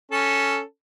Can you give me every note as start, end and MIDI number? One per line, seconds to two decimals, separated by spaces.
0.12 0.61 61
0.12 0.61 69